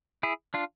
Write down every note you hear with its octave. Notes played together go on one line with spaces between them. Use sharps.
E4 G#4
D4 F4